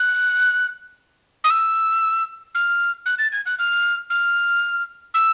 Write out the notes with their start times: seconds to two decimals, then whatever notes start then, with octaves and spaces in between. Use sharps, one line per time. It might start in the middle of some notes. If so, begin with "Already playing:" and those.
Already playing: F#6
1.44 D#6
1.50 E6
2.55 F6
3.06 F#6
3.19 A6
3.32 G#6
3.46 F#6
3.59 F6
4.10 F6
5.14 E6